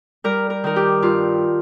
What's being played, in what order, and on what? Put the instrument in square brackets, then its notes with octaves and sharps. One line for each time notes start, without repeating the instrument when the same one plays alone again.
[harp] G3 A#4
A#4
D#3 A#4
G4
G2 F4